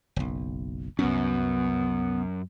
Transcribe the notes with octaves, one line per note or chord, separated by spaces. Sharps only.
F#1 B1
C2 F#2 B3 C#4